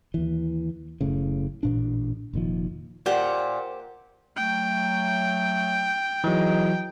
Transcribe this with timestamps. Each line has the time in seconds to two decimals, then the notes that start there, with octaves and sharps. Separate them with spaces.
0.14 D#2 E3
1.01 F#1 A2 C#3
1.63 A1 A#2 D4
2.33 F1 A#2 D#3 F3
3.06 A#2 G4 C5 F#5
4.37 F#3 A3 G5
6.24 E3 F#3 D#4 G#4 D#5